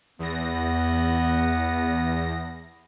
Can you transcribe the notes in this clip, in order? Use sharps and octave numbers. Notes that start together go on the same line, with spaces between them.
E2 B3 A#6